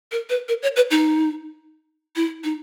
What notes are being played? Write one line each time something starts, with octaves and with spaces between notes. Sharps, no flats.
A#4
B4
A#4
C#5
B4
D#4
E4
D#4